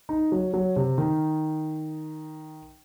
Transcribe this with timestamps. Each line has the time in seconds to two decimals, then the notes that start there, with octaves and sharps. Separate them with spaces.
0.09 D#4
0.32 F#3
0.54 F#3
0.76 C3
0.98 D#3